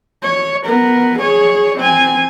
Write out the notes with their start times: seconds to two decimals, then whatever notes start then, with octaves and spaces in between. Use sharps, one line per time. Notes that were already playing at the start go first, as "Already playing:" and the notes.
0.23 C#5
0.66 B3 A#4
1.18 G#4 C#5
1.78 C4 G#5